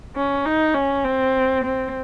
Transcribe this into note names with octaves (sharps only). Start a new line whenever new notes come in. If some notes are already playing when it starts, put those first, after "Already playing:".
C#4
D#4
C#4
C4
C4